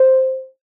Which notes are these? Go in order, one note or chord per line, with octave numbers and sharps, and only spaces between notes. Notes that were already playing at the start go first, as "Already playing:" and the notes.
Already playing: C5